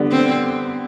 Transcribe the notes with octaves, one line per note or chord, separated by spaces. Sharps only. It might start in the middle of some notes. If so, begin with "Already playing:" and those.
Already playing: D3 G3 B3
C4